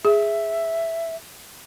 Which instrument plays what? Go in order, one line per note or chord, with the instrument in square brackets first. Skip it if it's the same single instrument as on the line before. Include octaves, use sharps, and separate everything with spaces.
[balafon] G#4 [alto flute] E5